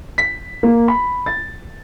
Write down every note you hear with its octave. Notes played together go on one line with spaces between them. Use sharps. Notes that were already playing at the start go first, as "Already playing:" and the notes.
B6
A#3
B5
A6